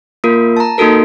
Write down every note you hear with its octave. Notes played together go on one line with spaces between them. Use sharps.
A#3 F4 A#4
A5 A#5
A#3 D#4 F#4 A4 A#4